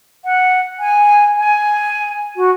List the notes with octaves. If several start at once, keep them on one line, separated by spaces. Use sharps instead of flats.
F#5
G#5
G#5
F#4